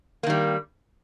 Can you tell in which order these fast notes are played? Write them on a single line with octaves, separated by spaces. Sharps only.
A#3 D#3 G3